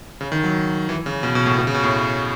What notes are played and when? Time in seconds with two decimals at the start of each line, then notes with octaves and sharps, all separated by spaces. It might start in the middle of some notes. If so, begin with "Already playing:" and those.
0.21 C#3
0.32 D#3
0.44 F#3
0.89 E3
1.06 C#3
1.23 B2
1.35 B2
1.46 A2
1.58 B2
1.67 C#3
1.74 B2
1.83 A2